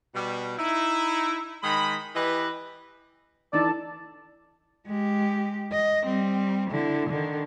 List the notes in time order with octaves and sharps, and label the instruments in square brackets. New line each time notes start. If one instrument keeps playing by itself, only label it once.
[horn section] B2 G3
D#4 E4
D#3 G#3 D#5 B5
E3 G4 B4 D#5
[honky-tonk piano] E3 D#4 [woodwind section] A4 A5 [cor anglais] D5
[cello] G#3 G4
D#5
G3 C4
D3 E4
D3 D#3